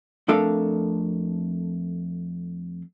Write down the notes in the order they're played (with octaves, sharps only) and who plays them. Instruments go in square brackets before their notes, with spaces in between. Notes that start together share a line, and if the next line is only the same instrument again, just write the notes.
[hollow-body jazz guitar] F2 A3 D4 A4 A#4 F5